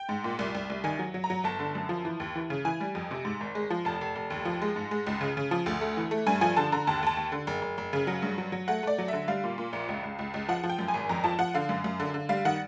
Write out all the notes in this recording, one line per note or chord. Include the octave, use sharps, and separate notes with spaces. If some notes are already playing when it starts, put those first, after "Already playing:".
Already playing: G5
G#2
A#2
C2
C2
C2
D#3 G#5
F#3
F#3
A#5
F#3
G1 A5
D3
F#2
F3
E3
D#2
E3
C#3
E3 G#5
G3
F2
C3
G#2
G#1
G#3
F3
F1 A5
F1
F1
D#2
F3
G#3
G#2
G#3
C#2
C#3
C#3
F3
D2
A3
E3
A3
G2 G#5
F3 G#5
D3 A5
D3 A#5
D#2 A5
D#2 A5
D#2
D3
F#1
F#1
F#1
C#3
F#3
G2
F#3
F#3
A3 F#5
A3 D5
F#3
D3 E5
G3 F5
A#2
A#2
A#1
C#2
C#2
C#2
C#2
F3 F#5
F3
G5
F#2
G#5
G#1
F2 A#5
F3 A5
F3 F#5
D3 F5
F#2
F#2
D3
D3
G3 F5
D#3 F#5